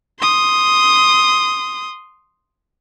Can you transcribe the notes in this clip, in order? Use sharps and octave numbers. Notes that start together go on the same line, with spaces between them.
C6 D#6